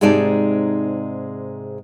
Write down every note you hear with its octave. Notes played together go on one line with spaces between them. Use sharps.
G#2 C3 G#3 D#4 D5 A5